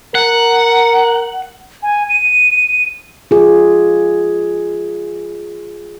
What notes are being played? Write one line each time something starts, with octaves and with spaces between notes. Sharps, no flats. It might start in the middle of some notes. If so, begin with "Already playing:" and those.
A#4 F#5
G#5
D#7
F4 G#4